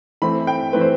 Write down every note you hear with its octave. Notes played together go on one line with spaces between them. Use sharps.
E3 A3 C4 B5
G5
E3 A3 C4 B4
C5